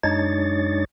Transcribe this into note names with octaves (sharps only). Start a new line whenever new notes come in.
F#2 G#3 D4 D#4 C#5 A6